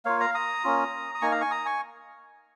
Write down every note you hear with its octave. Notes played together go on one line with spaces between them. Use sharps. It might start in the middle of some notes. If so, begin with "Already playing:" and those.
A#3 F4 C#5 F5
F5 A#5
A#5 D#6
A#3 C#4 F4
D#6
A#3 D#4 G#5 C#6
F5 A#5
G#5 C#6
A#5 D#6
G#5 C#6